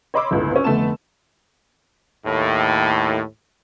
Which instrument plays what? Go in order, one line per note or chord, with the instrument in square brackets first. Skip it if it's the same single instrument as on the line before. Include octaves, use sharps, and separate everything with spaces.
[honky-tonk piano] C#5 D#5 B5 C6 D6 E6
G1 C#2 A2
C4 C#4
F1 D3 A3 B3 A5 E7
[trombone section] D#2 A2